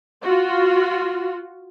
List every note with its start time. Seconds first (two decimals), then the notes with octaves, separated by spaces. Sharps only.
0.22 F4 F#4